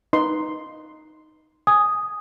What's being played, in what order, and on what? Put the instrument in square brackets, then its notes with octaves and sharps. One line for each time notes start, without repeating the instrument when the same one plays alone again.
[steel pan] D#4 B4 C6
[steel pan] G#5 [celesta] D#6